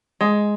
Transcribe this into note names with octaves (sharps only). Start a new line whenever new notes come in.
G#3